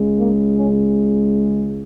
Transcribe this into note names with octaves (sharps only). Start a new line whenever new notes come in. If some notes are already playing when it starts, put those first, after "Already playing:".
Already playing: C#2 C#3 G#3
A#3
C#4